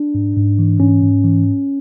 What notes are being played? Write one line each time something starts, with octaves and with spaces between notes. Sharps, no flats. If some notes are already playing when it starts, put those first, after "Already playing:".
Already playing: D4
G#2
G#2
E3
G#2 C#4
G#2
E3